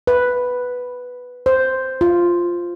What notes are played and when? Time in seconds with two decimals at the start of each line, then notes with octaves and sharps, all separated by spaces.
0.07 B4
1.46 C5
2.01 F4